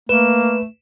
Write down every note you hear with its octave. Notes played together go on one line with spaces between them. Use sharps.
A3 A#3 B4 E7